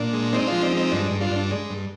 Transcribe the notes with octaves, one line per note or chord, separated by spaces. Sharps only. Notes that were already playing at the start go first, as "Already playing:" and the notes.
Already playing: A#2 D4
G#3
G#3 C4 D#4
D4 F4
F3
C4 D#4
G#3 C4 D#4
G2 D4
G2
D4 F4
G2
D4
G#3
G2